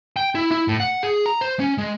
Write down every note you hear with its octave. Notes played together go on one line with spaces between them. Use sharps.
G5
E4
E4
A2
F#5
G#4
A#5
C5
C#4
G#3